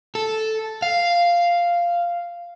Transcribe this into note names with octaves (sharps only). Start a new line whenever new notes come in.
A4
F5